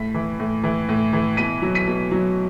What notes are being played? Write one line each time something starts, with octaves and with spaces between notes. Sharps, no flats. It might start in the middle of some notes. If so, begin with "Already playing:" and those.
Already playing: A2 B6
E3
A2
E3
A2
E3
B2 B6 D#7
F#3
B6 D#7
B2
F#3